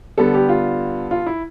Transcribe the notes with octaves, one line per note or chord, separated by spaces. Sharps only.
D3 G3 B3 A4
G4
F4
F4
E4